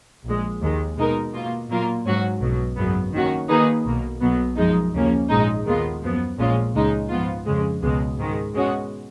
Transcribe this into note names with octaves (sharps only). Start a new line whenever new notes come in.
A#1 A#2 G#3
D#2 D#3 G#3
B2 G#3 D#4 A#4
B2 A#3 F4
A#2 F#3 A#3 F4 A#4
G#2 F#3 C#4 F#4
B1 B2 F#3
G#1 F#2 C#3 F#3 B3
D#3 A#3 C#4 F#4
D#3 A#3 D#4 G#4 B4
B1 B2 A#3
B1 B2 F#3 B3
F#2 F3 G#3 D#4
D#2 C#3 F3 A#3 C#4
A#1 G#2 F3 G#3 D#4
D#2 D#3 G#3 B3 F4
F#2 F3 B3
A#1 A#2 G#3 C#4 F4
C#2 C#3 G#3 D#4
G#2 F3 B3 F4
F2 C#3 G#3
C#2 B2 G#3
G#2 D#3 G#3
B2 G#3 C#4 F#4